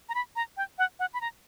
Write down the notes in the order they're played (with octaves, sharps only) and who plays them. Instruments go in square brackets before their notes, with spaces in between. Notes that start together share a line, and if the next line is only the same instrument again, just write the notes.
[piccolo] A#5
B5
A#5
G5
F#5
F#5
B5
A#5